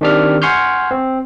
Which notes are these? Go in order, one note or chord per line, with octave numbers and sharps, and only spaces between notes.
D#3 C4 D4 G4 D5 F6
F#5 G#5 C6 C#6 F6 G6
C4